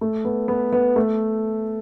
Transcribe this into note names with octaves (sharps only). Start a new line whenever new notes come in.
A3
B3
B3
B3
A3